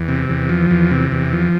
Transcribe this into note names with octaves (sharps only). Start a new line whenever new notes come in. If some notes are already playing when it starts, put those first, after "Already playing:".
Already playing: E2
C3
E2
F3
E2
C3
E2
F3